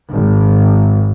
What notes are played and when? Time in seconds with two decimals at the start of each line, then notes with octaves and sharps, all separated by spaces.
0.12 G#1